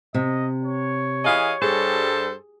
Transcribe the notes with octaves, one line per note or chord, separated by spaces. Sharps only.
C3 D#5
C#5
E3 G#4 D#5 F5
G2 G3 G#4 A4 C5